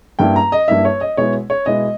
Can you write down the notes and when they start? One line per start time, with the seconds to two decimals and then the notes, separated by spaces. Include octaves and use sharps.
0.19 G2 G3 A#3 E4 G5
0.36 A#5
0.52 D#5
0.68 G2 G3 A#3 E4 E5
0.85 C#5
1.01 D#5
1.17 B2 G#3 B3 E4 C#5
1.50 C#5
1.66 B2 G#3 B3 E4 D#5